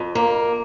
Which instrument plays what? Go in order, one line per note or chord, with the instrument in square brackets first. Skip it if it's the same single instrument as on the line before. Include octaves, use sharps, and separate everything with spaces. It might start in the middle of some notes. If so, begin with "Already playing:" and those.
Already playing: [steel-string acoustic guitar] F2
A#3